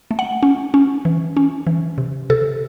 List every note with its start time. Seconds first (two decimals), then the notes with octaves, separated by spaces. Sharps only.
0.11 A3
0.19 F#5
0.43 C#4
0.74 C#4
1.05 E3
1.37 C#4
1.67 E3
1.98 C3
2.30 C3 A4